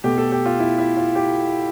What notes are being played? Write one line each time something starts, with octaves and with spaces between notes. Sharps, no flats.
B2 A3 G4
A4
G4
F4
E4
E4
F4
G4